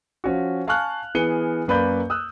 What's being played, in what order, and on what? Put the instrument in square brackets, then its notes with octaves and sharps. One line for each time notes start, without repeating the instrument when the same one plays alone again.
[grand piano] F3 C#4 F#4
F5 G#5 A5 C#6 F6 F#6
E3 B3 G#4 C#7 D#7 G7
F#2 A#3 B4 D5 B5 G6
D#6 E6 F#6